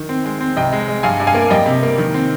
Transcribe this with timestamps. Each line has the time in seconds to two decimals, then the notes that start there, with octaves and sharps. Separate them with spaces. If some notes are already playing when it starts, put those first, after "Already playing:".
Already playing: D#3
0.09 C4
0.25 G#3
0.41 C4
0.57 C2 D#5 G5
0.73 G#3
0.88 G#3
1.03 G2 F5 G#5
1.20 G2
1.27 F5 G#5
1.35 A#3
1.50 G3 D#5 G5
1.66 C3
1.83 A#3
1.98 D#3
2.14 C4